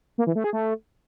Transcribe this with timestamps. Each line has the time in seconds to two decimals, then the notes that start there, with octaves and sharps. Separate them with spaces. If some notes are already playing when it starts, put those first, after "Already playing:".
0.18 A#3
0.27 E3
0.35 A3
0.44 G#4
0.53 A3